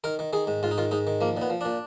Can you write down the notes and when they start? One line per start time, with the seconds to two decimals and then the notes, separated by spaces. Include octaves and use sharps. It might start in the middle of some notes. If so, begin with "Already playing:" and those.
0.04 D#3 A#4
0.19 D#3
0.33 D#3 G#4
0.47 G#2
0.63 G#2 F4
0.71 D#4
0.78 D#3 F4
0.91 G#2 D#4
1.07 D#3
1.21 F3 A#3
1.37 A#2 B3
1.50 F3
1.61 A#2 D4